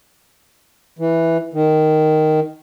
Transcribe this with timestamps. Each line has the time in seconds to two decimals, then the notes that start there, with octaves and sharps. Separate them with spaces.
0.99 E3
1.54 D#3